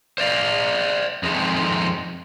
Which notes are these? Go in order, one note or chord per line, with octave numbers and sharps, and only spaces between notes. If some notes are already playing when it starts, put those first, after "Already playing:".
C5 D5 F5
F2 D#3 G#3 C4 G#4 C5